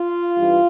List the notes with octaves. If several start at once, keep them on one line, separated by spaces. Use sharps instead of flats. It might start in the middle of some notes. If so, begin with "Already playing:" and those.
Already playing: F4
G2 E3 G3